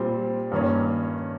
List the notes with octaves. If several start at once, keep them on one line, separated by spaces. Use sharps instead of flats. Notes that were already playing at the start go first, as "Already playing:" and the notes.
Already playing: A#2 G3 C4
G2 D#3 A#3 C#4